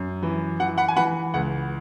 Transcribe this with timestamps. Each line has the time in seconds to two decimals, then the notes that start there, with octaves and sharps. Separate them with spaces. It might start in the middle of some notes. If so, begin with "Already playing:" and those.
Already playing: F#2
0.23 E3
0.60 E3 F#5
0.78 F#5 B5
0.88 G#5
0.97 E3 F#5 B5
1.34 C#2 F#5